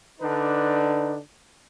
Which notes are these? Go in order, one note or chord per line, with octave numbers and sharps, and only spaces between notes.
D3 D4 D#4 B4